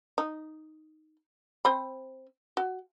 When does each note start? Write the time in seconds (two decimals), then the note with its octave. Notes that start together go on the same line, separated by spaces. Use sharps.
0.18 D#4
1.65 C4 C5 B5
2.57 F#4